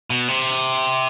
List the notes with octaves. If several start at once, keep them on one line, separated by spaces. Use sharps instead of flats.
B2
C3